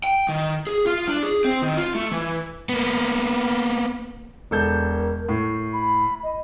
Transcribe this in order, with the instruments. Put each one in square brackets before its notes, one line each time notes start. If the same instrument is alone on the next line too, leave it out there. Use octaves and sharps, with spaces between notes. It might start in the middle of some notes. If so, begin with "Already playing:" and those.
[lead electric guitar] G5
D#3
G#4
F4
D4
G#4
C4
D#3
F4
A3
E3
[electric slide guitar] A#3 B3
[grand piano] E1 A4 G6 [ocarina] A#4
[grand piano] A2
[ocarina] B5
D#5